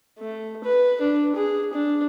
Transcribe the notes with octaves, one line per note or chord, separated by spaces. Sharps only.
A3
B4
D4
G#4
D4